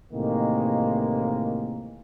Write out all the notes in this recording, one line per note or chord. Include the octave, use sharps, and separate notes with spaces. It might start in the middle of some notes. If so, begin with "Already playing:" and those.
A2 C3 D#3 E3 G#3 A#3